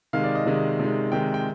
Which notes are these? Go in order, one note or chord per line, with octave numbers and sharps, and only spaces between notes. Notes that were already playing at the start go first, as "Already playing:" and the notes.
C3 D#3 G#3 F5
D5
D#5
C3 D#3 G#3
C3 D#3 G#3
C3 D#3 G#3 G5
G5